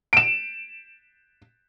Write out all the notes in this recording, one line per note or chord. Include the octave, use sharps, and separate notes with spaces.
D7 E7